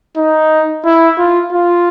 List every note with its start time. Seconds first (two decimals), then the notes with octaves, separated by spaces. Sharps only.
0.17 D#4
0.85 E4
1.18 F4
1.52 F4